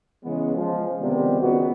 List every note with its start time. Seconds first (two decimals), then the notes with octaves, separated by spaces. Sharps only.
0.24 C#3 E3 G#3 B3
0.55 F3 G#3
1.01 C#2 C3 D#3 G3 B3
1.41 C#2 A#2 D#3 B3 F#4